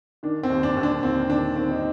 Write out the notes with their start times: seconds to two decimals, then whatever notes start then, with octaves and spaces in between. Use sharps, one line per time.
0.23 D#3 D4
0.43 C4
0.50 D#2
0.63 D4
0.76 D#2
0.83 D4
1.03 D#2 C4
1.29 D#3 D4
1.56 D#2 C4
1.71 D#4